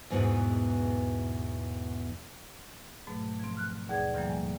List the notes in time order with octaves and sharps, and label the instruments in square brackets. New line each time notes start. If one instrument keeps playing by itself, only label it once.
[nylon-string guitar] E2 G#2 B2 E3
[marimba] G#2 B2 F#3 A3
F3 C4
F6 F#6
D#2 B2 G#4 D5 G#6
A2 D3 E3 F3 G3 A#3
G#5